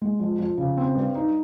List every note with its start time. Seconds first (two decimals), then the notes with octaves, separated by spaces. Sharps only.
0.02 G#3
0.20 F2
0.39 F2
0.58 C#3
0.77 C4
0.95 G2
1.15 D#4